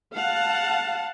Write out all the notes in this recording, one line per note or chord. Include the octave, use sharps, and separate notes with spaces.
F5 F#5 A5